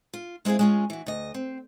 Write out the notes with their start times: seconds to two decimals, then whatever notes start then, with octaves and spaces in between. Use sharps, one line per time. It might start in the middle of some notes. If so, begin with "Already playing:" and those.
0.14 F4
0.45 G#3 C4 E4 G#4 F5
0.59 G#3 C#4 F4
0.90 E3 F#4
1.06 D2 D#5
1.34 C4